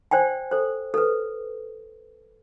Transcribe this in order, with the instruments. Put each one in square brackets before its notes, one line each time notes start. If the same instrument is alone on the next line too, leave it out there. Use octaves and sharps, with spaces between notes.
[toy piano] C5 D5 G5 G#5
A4 C5
A4 B4